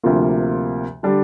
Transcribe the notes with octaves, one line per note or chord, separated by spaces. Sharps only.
D2 C3 F3 A#3 F4
D3 G3 D4